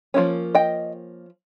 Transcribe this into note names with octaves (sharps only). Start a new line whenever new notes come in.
F3 A#3 C#4
D#5 G5